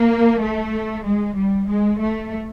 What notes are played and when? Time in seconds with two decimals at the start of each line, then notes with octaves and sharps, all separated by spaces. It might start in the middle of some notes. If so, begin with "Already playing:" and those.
Already playing: A#3
0.41 A3
1.04 G#3
1.36 G3
1.68 G#3
2.00 A3